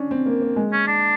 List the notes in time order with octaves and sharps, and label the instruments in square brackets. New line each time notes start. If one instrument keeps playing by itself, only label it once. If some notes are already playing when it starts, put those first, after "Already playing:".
Already playing: [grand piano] C#4 D4
C4
A#3
A#3
G#3
[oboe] C#4
D4